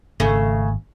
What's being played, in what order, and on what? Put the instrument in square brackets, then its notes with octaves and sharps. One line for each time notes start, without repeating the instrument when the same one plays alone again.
[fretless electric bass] G#1 [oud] C#3 A3